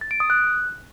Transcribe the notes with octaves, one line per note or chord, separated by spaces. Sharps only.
A6
D7
D#6
F#6